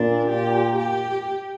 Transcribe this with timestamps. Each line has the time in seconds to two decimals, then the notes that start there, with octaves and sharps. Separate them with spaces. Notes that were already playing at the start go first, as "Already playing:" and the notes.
Already playing: A#2 D4
0.29 G4
0.78 G4